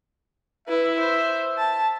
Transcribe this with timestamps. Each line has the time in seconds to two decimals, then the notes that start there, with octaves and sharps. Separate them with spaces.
0.68 E4 B4 E5
0.99 C5
1.58 A5